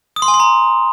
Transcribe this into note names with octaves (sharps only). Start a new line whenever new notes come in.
D#6
C6
G#5
C6
A#5